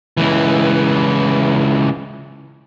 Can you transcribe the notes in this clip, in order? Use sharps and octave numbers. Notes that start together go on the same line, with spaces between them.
C#2 E3